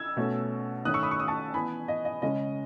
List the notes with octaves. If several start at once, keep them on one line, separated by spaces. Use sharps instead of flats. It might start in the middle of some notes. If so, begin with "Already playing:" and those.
Already playing: E6 G#6
B2 A3 C#4
D#3 A3 C#4 D#6 F#6
C#6 E6
B5 D#6
C#6
D#6
A5 C#6
E3 B3 G#5 B5
D#5
D#5
C#3 G#3 C#4 D#5